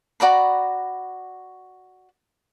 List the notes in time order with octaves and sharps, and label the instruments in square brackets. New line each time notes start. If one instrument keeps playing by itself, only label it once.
[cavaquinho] F#4 D5 A#5 B5